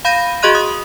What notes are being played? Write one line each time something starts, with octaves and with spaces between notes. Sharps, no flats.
F5 B5 G6 A#6 D#7
F#4 G#4 D#5 C6 F#6 D#7
D#6